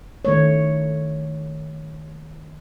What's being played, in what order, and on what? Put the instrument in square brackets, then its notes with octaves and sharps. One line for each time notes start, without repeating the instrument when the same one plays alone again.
[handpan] D#3 A3 C#5